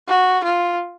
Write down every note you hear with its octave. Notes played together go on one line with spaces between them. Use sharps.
F#4
F4